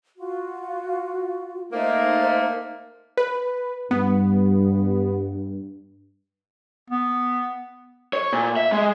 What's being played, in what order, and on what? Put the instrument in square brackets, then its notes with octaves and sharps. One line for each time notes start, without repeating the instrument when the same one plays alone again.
[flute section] F4 F#4
[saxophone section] A3 A#3 [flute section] D#4 C5
[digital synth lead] B4
[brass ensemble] G2 [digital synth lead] B3
[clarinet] B3
[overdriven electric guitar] C#5
A#2
E5
G#3